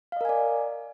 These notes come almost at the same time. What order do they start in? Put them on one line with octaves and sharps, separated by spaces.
F5 D#5 A#4 G#5 D5